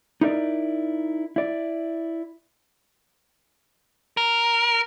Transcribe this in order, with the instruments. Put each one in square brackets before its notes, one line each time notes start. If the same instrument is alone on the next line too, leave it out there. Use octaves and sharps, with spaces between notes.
[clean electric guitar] D#4 E4 A#4 D5
E4 D5
[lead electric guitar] A#4